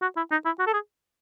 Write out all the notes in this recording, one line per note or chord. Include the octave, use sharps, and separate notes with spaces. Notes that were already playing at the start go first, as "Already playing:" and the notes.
F#4
E4
D#4
E4
F#4
A4
G#4